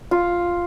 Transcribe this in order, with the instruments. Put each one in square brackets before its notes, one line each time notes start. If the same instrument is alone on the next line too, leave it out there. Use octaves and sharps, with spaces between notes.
[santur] F4